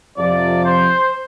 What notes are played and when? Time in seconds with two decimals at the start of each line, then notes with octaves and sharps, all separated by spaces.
0.17 F2 C3 F3 D5
0.63 C5